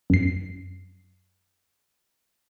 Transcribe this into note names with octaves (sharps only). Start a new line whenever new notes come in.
F#2 C7